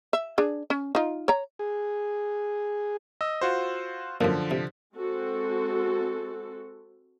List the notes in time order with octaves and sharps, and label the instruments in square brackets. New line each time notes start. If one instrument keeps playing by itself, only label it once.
[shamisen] E5
D4 G#4
C#4
D#4 F4
C#5 A#5
[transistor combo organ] G#4
[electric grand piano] D#5 E6
F4 F#4 C5
[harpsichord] F#2 A#2 [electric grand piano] D3 F3
[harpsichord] C3
[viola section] G#3 C4 F#4 A4